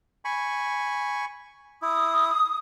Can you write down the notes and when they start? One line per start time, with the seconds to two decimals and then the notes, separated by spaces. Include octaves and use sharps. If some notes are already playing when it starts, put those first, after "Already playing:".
0.25 G#5 B5 C#6
1.82 E4 D#6